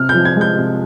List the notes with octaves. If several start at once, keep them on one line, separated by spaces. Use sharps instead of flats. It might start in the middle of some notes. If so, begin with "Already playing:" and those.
Already playing: C3 F6
G6
F3
G#6
G#3
G6
C3